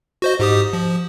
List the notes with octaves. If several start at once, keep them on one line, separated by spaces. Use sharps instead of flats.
F#4 C5 D#5
G#2 G4 D#6
F3